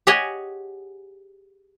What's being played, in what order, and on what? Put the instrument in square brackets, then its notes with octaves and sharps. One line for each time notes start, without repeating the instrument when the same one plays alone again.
[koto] G4 G#4 C#5 D#5 F#5 G#5